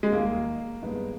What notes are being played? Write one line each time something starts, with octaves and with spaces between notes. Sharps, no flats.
G#3
D#2 D#3 G3 A#3
G2 D#3 G#3 B3 D#4